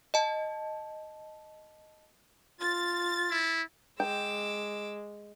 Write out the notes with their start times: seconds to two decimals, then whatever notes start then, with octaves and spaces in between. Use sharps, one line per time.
0.14 D#5 A5
2.61 F4 A6
3.30 E4
4.00 G#3 G5 D6 E6